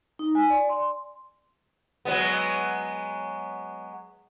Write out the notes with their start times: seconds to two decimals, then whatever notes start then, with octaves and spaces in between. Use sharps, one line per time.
0.19 D#4
0.35 G#5
0.50 D5
0.69 C6
2.05 F#3 G#3 B3